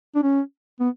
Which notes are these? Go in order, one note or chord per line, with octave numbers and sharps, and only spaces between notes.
D4
C#4
B3